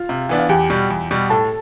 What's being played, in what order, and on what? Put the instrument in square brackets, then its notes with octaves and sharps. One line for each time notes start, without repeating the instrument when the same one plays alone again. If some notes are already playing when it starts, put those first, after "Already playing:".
Already playing: [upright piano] F4 F5
[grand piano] C3
E3 B3 D4
[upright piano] F5
[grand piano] E2 [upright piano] G4 G5
[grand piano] B2 G3
E2
B2 G3
[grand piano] A2 [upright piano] A4 A5